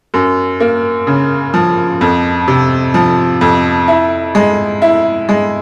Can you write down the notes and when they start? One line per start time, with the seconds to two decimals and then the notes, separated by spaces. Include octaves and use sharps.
0.14 F#2
0.60 A#3
1.07 C#3
1.54 F3
2.01 F2
2.48 C3
2.94 F3
3.41 F2
3.88 E4
4.35 G#3
4.82 E4
5.29 G#3